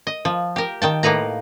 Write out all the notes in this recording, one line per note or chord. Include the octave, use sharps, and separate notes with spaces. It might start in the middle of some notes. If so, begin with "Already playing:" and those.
D#5
F3
G4 A#4
D#3 G5 A5
A2 A#3 D#4 B4 A#5